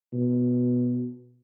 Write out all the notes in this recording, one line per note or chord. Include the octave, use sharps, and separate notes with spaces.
B2